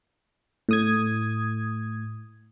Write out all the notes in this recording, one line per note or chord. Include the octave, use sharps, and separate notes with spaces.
A2 D#6 G#6